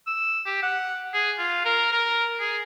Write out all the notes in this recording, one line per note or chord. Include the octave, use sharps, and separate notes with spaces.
E6
G4
F#5
G#4
F4
A#4
A#4
G#4